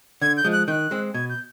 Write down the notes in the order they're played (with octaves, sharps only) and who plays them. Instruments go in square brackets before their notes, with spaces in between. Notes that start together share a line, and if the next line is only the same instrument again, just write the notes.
[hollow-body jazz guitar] D3 [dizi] G#6
[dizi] G6
[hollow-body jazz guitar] F3 G#3
[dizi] F#6
[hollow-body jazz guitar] D#3 [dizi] F#6 G6
[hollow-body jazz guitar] G#3 C4
[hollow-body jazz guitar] B2 [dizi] G#6
[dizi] G6